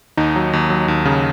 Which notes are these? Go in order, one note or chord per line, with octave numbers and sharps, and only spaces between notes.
D#2 D#4
F#3
D#2
F#3
D#2
C#3